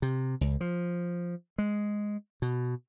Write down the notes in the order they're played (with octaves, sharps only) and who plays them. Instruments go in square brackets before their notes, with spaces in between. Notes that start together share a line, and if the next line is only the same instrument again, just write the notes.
[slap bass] C3
C#2
F3
G#3
B2